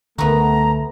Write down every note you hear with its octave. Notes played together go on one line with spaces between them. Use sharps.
C#2 D3 A3 B3 F#4 A#5